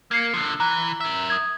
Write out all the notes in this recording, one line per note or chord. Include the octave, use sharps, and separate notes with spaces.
A#3 G#6 C7 C#7
D3 F3
E3 A#5 F#6
A#4 E5
D#6 G#6